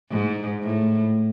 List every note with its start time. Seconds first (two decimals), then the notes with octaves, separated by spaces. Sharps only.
0.10 G#2
0.63 A2